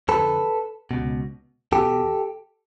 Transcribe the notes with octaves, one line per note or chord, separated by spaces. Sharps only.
F2 D3 A4 B4
C#2 B2
E2 B2 G4 A4